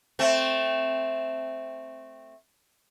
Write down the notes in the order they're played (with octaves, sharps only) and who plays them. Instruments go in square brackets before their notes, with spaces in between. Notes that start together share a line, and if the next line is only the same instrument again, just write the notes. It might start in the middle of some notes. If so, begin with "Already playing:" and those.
[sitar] A3 C4